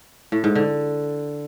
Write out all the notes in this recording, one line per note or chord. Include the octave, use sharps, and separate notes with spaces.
A2
G#2
D3